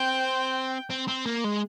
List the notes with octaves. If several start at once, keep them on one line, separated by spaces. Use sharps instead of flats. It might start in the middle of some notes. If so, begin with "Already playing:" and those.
Already playing: C4 G5
C4
C4
A#3
G#3